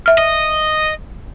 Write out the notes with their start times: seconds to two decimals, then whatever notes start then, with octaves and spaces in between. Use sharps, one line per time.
0.06 E5 F6
0.18 D#5